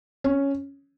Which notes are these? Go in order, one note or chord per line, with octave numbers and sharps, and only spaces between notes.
C#4